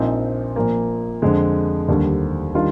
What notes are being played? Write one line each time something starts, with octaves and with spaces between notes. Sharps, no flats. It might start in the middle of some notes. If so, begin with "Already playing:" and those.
Already playing: A#1 A#2 F3 C4 D#4
A#2 F3 A#3
F2 D3 G#3
D#2 D3 G3 D4
D#3 G3 D4 F4